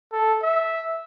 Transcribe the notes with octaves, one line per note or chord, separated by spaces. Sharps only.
A4
E5